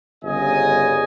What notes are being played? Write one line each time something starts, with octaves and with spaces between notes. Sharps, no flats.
G1 C#3 D#5 G#5